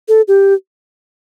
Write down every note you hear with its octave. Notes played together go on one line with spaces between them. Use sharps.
A4
G4